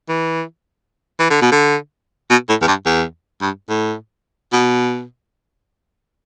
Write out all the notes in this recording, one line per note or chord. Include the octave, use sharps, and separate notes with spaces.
E3
E3
D3
B2
D3
B2
A2
E2
G2
E2
G2
A2
B2